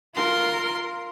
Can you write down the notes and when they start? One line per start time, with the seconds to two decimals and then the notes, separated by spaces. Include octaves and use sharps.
0.15 F4 A#4 C6